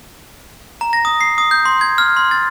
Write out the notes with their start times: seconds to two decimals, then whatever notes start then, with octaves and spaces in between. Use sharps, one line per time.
0.81 A#5
0.93 A#6
1.05 D#6
1.21 C7
1.38 D#6
1.51 G6
1.65 C6
1.81 G#6
1.98 F6
2.17 C6
2.31 A6